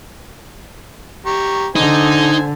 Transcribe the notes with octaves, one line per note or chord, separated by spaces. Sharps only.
G4 A#5 C#6
D3 D#4 C5 G#5